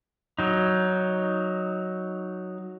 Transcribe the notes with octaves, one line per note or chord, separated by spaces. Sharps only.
F#3 D#4